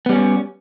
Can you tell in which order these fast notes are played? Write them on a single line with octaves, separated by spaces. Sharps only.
B3 G3 C#4